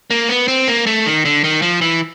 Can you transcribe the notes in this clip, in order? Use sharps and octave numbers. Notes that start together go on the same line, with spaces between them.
A#3
B3
C4
A#3
A3
D#3
D3
D#3
F3
E3